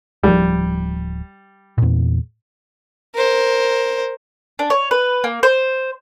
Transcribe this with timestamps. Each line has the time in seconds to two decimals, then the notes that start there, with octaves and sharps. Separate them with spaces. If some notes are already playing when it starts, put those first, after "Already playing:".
0.23 D1 F3 G3
1.78 E2 A#2
3.14 A#4 C5
4.59 D4
4.70 C#5
4.91 B4
5.24 A#3
5.43 C5